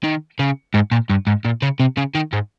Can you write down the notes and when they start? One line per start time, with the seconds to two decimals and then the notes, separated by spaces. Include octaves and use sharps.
0.04 D#3
0.39 C#3
0.74 G#2
0.92 A#2
1.10 G2
1.27 G#2
1.45 A#2
1.62 C#3
1.80 C3
1.97 C#3
2.15 D#3
2.33 G#2